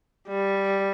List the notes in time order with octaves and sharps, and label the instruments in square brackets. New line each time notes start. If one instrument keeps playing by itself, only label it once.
[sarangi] G3